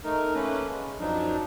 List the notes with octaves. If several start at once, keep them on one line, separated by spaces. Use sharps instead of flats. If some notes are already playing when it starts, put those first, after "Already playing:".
A3 D#4 A#4
A3 A#3 C#4 B4
G#3
F#2 F3 F#3 D4 D#4